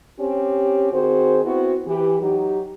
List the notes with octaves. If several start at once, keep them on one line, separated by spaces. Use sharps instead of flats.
C4 C#4 G4
D#3 C4 F#4 G#4 C5
B3 C4 E4 F#4
E3 G4
F#3 D#4 G4